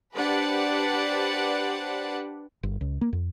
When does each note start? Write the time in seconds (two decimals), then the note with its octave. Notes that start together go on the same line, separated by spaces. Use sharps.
0.15 D4 G4 B4 C5 D5 F#5
2.63 G1
2.81 C#2
3.01 A#3
3.13 F2